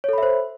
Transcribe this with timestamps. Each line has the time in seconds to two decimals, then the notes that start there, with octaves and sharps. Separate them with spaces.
0.04 C#5
0.09 A4
0.13 B5
0.18 E5
0.23 C5